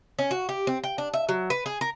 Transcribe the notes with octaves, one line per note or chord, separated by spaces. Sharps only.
C#4
F#4
G4
C4
G5
D4
E5
F#3
B4
G#4
A#4